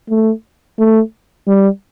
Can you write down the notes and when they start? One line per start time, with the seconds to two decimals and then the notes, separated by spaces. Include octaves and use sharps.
0.10 A3
0.79 A3
1.48 G3